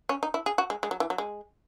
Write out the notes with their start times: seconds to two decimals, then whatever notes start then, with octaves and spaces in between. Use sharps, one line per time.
0.09 C#4
0.23 D#4
0.34 E4
0.46 G#4
0.58 F#4
0.70 G#3
0.83 G#3
0.91 F#3
1.00 E3
1.10 F#3
1.18 G#3